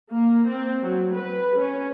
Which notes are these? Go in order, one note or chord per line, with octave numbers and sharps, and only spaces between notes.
A#3
C4
F#3
B4
C#4